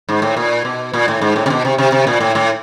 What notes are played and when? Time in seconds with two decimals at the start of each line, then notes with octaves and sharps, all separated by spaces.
0.09 G#2
0.22 A2
0.37 A#2
0.65 B2
0.93 A#2
1.08 A2
1.21 G#2
1.36 A2
1.46 C3
1.50 B2
1.65 C3
1.78 C3
1.92 C3
2.07 A#2
2.21 A2
2.35 A2